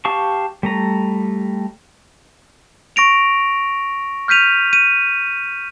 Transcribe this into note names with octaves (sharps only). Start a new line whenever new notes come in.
G4 F5 A5 C#6
G3 A3 A#5
C#6 A#6 D7 F7
F6 G6 B6 D#7 F7
D#7